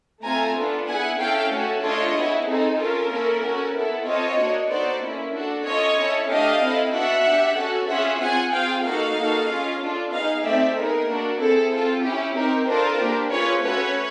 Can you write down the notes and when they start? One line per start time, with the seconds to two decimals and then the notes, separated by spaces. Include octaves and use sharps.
0.23 A3 C4 F4 A4 G#5 A#5
0.55 B3 D4 F4 A4
0.87 B3 E4 G#4 F#5 G#5
1.19 C#4 E4 A4 F5 G5
1.51 A3 C#4 F#4 A4
1.82 A3 D4 F4 A4 C#5 D#5
2.15 B3 E4 G#4
2.47 C4 D#4 G#4 A4
2.78 C#4 F4 A4 A#4
3.10 A#3 C#4 E4 A4
3.42 C#4 F#4 A4
3.74 B3 E4 A4
4.06 C4 F4 A4 C#5 D#5
4.38 A#3 D4 F#4
4.69 B3 D#4 F#4 A4 C5 D5
5.02 A#3 C#4 E4
5.33 D4 F#4 A4
5.65 C#4 F4 A4 C#5 D#5
5.97 C#4 E4 A4
6.29 A3 D4 G4 D#5 F5
6.61 C4 E4 A4
6.93 B3 D4 F#4 E5 F#5
7.25 D4 G4
7.57 C#4 F#4 A4
7.89 C#4 F4 G#4 E5 F#5
8.20 C4 F4 G#4 F#5 G#5
8.52 C4 F4 G#4 F5 G5
8.84 A#3 D#4 F#4 A4 D#5 F5
9.16 A#3 D#4 F#4 A4
9.48 C#4 F4 G#4
9.80 D4 F4 A4
10.12 B3 D#4 G#4 D#5 F5
10.43 A3 C4 D#4 G4 D5 E5
10.75 B3 D#4 G#4 A#4
11.08 A#3 D4 F#4
11.40 C4 E4 G#4 A4
11.71 C4 F4 A4
12.03 C#4 E4 G4
12.35 C4 D#4 G4 A#4
12.67 D4 F4 A4 A#4 C5
12.99 A#3 D4 G4
13.31 C#4 F4 G#4 B4 C#5
13.63 A3 C#4 F#4 A4 B4 C#5